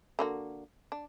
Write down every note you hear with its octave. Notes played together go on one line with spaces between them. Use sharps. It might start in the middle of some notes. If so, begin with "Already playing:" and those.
D3 A#3 F#4
D4